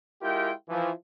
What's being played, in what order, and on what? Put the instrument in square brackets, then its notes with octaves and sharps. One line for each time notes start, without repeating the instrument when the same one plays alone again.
[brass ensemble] G#3 E4 F4 G4 A#4 G5
E3 F3